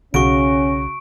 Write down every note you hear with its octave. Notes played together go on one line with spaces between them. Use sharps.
B1 C#3 C#4 F#4 C#6 D7